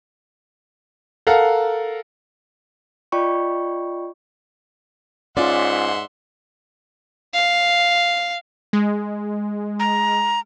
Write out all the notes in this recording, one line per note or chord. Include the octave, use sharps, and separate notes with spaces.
A4 A#4 F5 F#5 A#5
F4 D5 D#5 G5 B5 C#6
G#2 C#4 F4 D5 E5 F#5 C6
F5
G#3
A#5